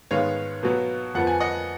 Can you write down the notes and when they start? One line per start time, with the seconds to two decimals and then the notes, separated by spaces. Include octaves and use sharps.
0.11 G#2 D#3 G#3 B3 C#5 F5
0.63 B2 F#3 B3
1.15 F2 F3 B3 F#5
1.27 G#5
1.40 D#5 F#5